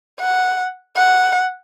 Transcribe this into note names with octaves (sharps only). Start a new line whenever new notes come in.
F#5
F#5